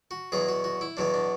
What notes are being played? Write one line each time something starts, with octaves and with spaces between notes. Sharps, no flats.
F#4
E2 B2 F#3 B3 G#4
F#4
F#4
E4
E2 B2 F#3 B3 D4
D4